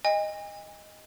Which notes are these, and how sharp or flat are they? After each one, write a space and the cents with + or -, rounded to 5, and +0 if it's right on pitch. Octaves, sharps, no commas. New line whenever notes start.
D#5 +0 G#5 -40